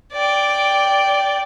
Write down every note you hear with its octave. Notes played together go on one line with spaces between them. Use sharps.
D5 G5